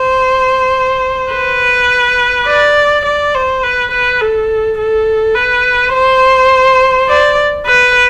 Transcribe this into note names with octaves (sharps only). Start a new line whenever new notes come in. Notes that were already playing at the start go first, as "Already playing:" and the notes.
Already playing: C5
B4
D5
D5
C5
B4
B4
A4
A4
B4
C5
D5
B4